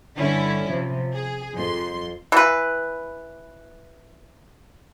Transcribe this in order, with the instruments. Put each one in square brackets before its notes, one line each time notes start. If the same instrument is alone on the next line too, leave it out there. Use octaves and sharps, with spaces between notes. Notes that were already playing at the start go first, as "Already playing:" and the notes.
[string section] G2 D3 C#4 E4
C3 F3
G#4
F2 C6
[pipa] E3 B4